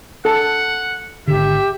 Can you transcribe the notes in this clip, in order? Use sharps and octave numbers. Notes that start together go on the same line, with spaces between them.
A4 F#5
G#1 D3 G4 E5